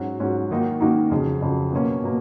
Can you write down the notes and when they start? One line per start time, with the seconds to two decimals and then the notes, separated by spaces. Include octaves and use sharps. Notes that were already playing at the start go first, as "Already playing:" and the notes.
Already playing: G#2 F#3 C#4 F#4
0.19 G#2 F#3 C#4 F#4
0.51 D#3 A#3 D#4 F#4
0.81 D#3 A#3 D#4 F#4
1.11 F2 C#3 F#3
1.42 F2 C#3 F#3
1.72 B2 F#3 A#3 C#4
2.04 B2 F#3 A#3